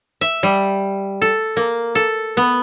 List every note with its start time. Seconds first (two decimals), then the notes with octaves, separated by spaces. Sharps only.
0.21 E5
0.43 G3
1.22 A4
1.57 A#3
1.95 A4
2.37 B3